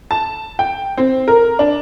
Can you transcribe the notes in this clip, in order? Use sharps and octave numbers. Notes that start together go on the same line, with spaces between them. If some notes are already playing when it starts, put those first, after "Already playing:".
A5
G5
C4
A#4
D4